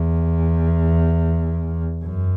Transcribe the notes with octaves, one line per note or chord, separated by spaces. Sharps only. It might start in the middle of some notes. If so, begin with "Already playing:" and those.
Already playing: E2
F#2